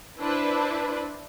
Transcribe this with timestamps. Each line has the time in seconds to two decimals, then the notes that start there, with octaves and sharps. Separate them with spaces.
0.20 D4 E4 B4 C5